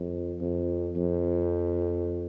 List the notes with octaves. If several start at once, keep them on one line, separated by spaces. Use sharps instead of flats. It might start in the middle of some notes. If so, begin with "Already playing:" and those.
Already playing: F2
F2
F2